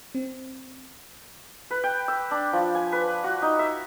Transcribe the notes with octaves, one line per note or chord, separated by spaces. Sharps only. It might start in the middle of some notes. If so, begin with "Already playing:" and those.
C4
B4
G5
E6
D4
F3
G#5
B4
F#4
D#4
E5